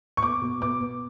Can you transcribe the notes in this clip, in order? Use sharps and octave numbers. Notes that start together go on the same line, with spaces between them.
C#6
B3 D6
B2
B3 D6
B3